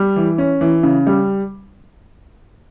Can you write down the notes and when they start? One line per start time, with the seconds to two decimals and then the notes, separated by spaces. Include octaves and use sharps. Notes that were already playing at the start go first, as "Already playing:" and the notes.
Already playing: G3
0.16 E3
0.38 C#4
0.61 E3
0.83 C#3
1.07 G3